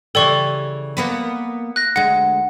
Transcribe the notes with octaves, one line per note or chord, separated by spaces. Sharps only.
C#3 E3 G4 A4 D5 C#6
A#3 B3 B4
F#6 A#6
D2 G#3 F#5